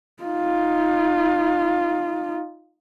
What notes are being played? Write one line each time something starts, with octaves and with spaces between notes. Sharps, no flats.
D#4 F4